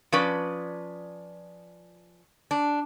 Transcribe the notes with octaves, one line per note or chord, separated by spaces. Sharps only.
F3 C#4 B4 D5
D4